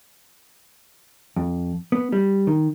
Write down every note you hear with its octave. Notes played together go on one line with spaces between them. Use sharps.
F2
B3
G3
D#3